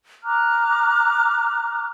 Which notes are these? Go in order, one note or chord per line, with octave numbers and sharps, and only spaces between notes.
A#5 D6 F6 F#6